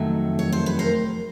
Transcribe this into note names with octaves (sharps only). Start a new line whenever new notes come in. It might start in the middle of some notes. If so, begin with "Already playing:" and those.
Already playing: F2 C3 D#3 F#3 A3
C#5
C5
B4
A#4 C5